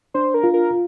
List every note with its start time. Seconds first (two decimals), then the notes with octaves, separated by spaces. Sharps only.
0.14 D4 C5
0.34 A#4
0.44 F4
0.54 A#4